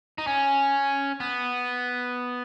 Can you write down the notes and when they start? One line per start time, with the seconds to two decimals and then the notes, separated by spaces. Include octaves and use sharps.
0.18 D#4
0.27 C#4
1.20 B3